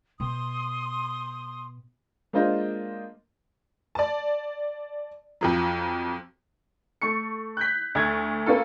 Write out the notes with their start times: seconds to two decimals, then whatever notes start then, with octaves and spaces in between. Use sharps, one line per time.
0.20 B2 C6 D#6
2.33 G#3 A#3 D4 F4 C5 D#5
3.95 D5 A5
5.41 F2 F3 F#3
7.02 A3 C#6 C#7
7.57 F#6 G6 B6
7.95 D2 A3 G#6
8.46 A#3 B3 C#4 F4 A4